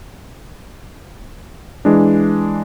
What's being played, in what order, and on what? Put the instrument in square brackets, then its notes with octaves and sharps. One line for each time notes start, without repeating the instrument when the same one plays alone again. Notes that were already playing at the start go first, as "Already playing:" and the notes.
[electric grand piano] E3 G#3 D4